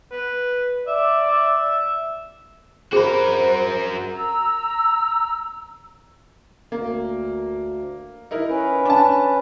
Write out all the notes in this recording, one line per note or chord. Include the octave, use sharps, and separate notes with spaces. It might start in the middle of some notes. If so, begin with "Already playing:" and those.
B4
D5 E5
E5
F#4 G#4 A#4 C5 B5
A#5 E6
D2 A#3
D#4 E4 A#4
C#4 B4
D4 A5